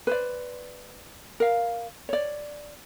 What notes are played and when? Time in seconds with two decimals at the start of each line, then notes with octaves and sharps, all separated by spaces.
0.07 B4 C5 D5
1.40 A#4 F5
2.09 C#5 D5